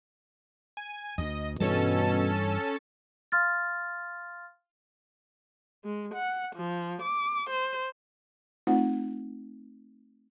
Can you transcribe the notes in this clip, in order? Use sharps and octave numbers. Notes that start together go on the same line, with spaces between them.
G#5
D2 D#5
G2 B2 E3 G3 C#4 A4 A5
F5 C6 F6 A6
G#3
F#5
F3
D6
C5
A3 C4 D#4 F4 F#5